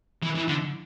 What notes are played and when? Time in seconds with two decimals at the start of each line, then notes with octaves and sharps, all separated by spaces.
0.23 E3
0.36 E3
0.48 D3